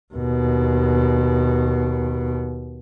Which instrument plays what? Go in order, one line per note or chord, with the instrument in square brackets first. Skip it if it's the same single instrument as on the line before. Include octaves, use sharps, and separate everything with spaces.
[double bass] D#2 B2